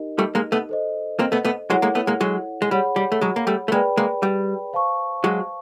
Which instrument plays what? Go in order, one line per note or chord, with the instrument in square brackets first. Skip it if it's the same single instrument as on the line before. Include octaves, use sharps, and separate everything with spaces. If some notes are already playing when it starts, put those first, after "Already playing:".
Already playing: [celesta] D#4 G4 A#4 D#5
[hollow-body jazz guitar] G3 A3
G#3 A#3
A3 B3
[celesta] A4 C5 D#5
[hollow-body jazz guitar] A#3 C4
A3 B3
A3 B3
[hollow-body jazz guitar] F#3 G#3 [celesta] E4 A4 C#5 F#5
[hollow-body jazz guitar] G#3 A#3
A3 B3
G#3 A#3
F#3 G#3
G#3
[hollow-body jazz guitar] G3 [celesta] G#4 C#5 F#5 B5
[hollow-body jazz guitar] G3
A3
F#3 G#3
A#3
G3 A3
A3
[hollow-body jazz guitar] G#3 A#3 [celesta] G#4 B4 D5 G5 B5
[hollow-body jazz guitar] G#3 A#3
G3
[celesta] C5 F5 A5 C#6
[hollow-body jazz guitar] F#3 G#3